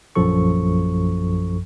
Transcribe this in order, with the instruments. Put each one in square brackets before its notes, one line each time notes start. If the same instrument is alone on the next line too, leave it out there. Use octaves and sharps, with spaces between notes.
[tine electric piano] A#1 F#2 F3 A4 C#6